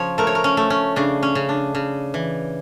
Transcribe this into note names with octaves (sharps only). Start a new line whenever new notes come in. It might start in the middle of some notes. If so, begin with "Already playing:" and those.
Already playing: C#3 F3 C#5
A3 A#4
C#5
A#4
C#4
A3
C#4
C#3 D4
C#4
C#3
D4
C#3
E3